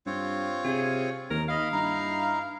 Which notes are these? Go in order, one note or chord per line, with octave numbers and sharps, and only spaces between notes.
G2 C4 F4 C#5
C3 G#4
D#2 D#4 A#4
D#5 F5 B5
G2 D#4 E4 A#5